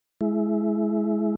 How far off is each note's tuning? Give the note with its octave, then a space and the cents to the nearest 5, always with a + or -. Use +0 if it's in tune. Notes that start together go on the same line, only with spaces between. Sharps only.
G#3 +25 E4 +0